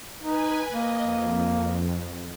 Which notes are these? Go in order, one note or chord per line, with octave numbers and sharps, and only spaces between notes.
D#4 B4 G#5
A#3 D#5
F2